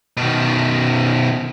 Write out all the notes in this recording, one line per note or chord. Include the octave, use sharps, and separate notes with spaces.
B2 D#3